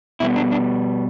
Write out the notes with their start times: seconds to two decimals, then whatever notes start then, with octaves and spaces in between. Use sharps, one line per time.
0.20 B2 G3 B3 E4
0.36 D4
0.51 D4